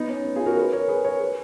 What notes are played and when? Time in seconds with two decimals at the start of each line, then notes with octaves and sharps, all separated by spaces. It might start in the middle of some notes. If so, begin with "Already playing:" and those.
Already playing: B3 D#4
0.09 C#4
0.25 B3
0.36 F4 G#4
0.46 F#4 A#4
0.57 G#4 B4
0.73 A#4 C#5
0.88 G#4 B4
1.05 A#4 C#5
1.20 G#4 B4